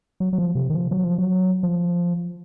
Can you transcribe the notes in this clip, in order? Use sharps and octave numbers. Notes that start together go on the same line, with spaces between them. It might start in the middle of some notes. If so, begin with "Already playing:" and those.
F#3
F#3
F3
C3
D#3
F3
F#3
F3
F#3
F3